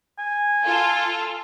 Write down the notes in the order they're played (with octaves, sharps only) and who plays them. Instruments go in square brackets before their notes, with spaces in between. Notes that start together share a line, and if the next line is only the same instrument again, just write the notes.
[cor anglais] G#5
[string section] F4 A4